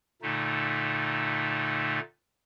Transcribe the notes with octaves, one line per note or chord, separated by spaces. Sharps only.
A#2 D3 A3 D#4